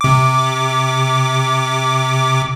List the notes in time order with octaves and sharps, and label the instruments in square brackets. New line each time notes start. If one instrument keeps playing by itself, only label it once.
[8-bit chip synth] C3 D6